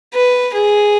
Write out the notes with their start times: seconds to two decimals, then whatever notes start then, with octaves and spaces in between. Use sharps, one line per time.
0.14 B4
0.53 G#4